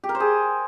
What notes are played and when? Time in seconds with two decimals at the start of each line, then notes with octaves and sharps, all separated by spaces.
0.03 G4
0.09 A#4
0.15 C5
0.20 G#4